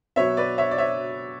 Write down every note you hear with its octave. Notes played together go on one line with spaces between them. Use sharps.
B2 F#3 B3 C#5 E5
B4 D5
C#5 E5
D5
C#5 E5